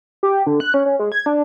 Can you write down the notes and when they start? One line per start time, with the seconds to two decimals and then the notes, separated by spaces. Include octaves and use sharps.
0.23 G4
0.46 D3
0.60 F#6
0.74 C#4
0.86 C#4
0.99 G#3
1.12 G#6
1.26 D4